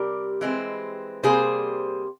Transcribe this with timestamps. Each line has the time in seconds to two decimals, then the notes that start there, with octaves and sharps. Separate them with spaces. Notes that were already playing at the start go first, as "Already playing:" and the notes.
Already playing: C3 G3 G4 A#4
0.41 E3 G#3 C4
1.23 C3 G3 A#3 G#4 C5